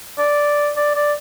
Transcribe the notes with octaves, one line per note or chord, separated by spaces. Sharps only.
D5
D5
D5